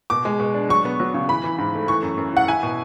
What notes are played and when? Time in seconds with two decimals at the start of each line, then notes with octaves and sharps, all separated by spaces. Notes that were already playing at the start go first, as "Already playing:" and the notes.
0.10 B2 D6
0.25 G#3
0.40 B2
0.54 D4
0.69 F#3 C#6
0.85 B3
1.00 F#3
1.14 C#3
1.29 E3 B5
1.44 E3
1.58 G#2
1.74 A3
1.88 E3 C#6
2.03 F#2
2.18 F#2
2.33 E3 F#5
2.48 E4 G#5
2.63 B2